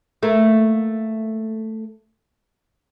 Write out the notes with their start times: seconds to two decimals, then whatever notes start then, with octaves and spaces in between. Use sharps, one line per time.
0.23 A3 A#3